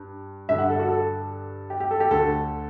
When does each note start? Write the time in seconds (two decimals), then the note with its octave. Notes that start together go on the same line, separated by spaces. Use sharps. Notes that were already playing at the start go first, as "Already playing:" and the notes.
Already playing: G2
0.49 G2 D3 E5
0.58 F#5
0.70 A4
0.79 F#4
0.89 A4
1.70 G4
1.80 G4
1.91 A4
2.00 G4
2.11 D2 D3 A4